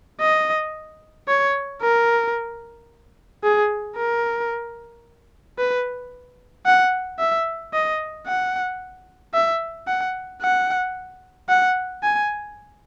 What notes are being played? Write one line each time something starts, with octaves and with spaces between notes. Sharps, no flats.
D#5
C#5
A#4
G#4
A#4
B4
F#5
E5
D#5
F#5
E5
F#5
F#5
F#5
G#5